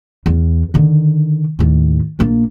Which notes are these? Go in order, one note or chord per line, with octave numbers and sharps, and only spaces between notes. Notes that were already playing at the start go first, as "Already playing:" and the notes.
E2
D3 D#3
D#2 A2
A#1 A#3